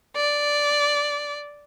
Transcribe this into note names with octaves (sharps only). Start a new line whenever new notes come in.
D5